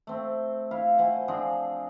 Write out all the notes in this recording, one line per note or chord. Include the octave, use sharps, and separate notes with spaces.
A3 C4
E4 F5
C5 F#5 G#5
F3 C4 D4 G#4